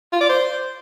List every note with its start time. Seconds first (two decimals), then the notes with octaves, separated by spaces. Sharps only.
0.12 F4
0.21 D5
0.29 C5